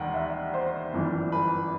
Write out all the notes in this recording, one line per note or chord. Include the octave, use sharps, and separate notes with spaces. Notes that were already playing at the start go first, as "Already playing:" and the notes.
Already playing: E1 D#2 D#3 G3 F#5 G5
E5
C5
G1 F#2 E3 G3
B4